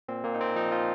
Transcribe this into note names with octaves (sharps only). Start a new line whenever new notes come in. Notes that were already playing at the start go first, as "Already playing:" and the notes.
A#2 C4
A#2 A#3
D#4
A#2 C4
F3 D#4
F3 F4